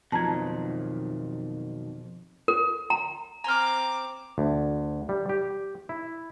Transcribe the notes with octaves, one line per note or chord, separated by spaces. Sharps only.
F2 B2 D#3 F#3 A5 A#5 G#6
A#4
A#5
C4 G#5 A#5 C6 D6 F6
D2
G3
G4
E4